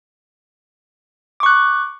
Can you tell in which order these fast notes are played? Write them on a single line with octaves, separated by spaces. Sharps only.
D6 C#6 F#6